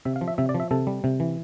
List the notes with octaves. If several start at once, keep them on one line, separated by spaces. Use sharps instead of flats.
C3 E5
F5
F3
E5
C3 E5
D5
F3
E5
C3 A4
G3
C3
E3